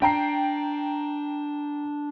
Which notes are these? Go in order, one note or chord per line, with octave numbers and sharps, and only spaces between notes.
D4 G5 A#5 C7